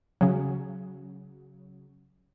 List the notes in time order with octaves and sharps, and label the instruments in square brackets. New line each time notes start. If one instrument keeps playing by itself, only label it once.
[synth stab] C#3 F#3